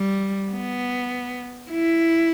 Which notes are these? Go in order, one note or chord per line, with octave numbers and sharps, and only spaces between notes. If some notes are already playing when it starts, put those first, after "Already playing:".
Already playing: G3
B3
E4